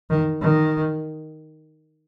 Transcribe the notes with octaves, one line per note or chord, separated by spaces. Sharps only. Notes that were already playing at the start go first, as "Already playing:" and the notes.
D#3
D#3